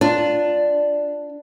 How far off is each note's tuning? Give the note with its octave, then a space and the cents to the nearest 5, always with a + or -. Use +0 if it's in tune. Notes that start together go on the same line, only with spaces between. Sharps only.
D4 +0 F4 +0